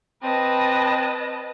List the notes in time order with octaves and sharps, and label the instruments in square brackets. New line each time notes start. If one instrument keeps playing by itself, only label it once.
[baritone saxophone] C4 [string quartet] B4 D#5 A5